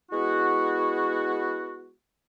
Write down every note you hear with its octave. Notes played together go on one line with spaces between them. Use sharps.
G#3 B3 E4 F#4